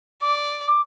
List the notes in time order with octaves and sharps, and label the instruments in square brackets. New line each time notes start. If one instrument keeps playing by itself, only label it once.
[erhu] D5 [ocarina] D6
[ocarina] D6